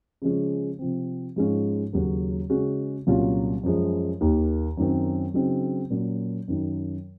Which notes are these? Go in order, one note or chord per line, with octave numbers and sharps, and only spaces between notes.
C#3 F3 G#3 C#4
C3 F3 C4
G#2 F3 G#3 C#4 F4
D#2 C#3 F#3 C#4 F#4
C#3 G#3 C#4 F#4
C2 A#2 F#3 C#4 F4
F#2 F3 G#3
D#2 D#3 A#3
F#2 D#3 F#3 C4
C#3 F#3 C4 D#4 F#4
A#2 F#3 C#4
F#2 D#3 F#3